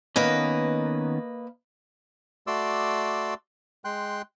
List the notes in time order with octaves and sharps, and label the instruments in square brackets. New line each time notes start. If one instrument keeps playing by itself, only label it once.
[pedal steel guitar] D#3 B3 C#4 [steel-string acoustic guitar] A#3 B4 D#5
[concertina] A3 F#4 D5 C6 D6 E6
G#3 G5 C6 F#6